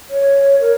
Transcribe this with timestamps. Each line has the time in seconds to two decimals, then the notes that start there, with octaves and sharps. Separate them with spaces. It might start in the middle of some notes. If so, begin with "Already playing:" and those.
0.10 C#5
0.61 A#4